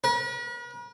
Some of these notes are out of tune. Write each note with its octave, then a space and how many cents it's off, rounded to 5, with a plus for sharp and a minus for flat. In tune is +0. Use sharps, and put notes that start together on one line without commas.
B4 -45